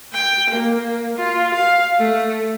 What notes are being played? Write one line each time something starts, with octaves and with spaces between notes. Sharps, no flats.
G5
A#3
F4
F5
A3